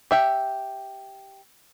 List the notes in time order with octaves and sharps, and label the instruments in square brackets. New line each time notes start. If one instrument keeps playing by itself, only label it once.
[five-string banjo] G4 E5 G5